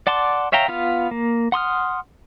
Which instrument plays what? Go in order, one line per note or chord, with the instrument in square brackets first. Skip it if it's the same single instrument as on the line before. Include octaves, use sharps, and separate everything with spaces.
[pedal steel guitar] D5 F#5 A5 C6 D6
C#5 E5 F5 G5 A#5
B3 F4 F5
A#3
F#5 C6 D#6 F6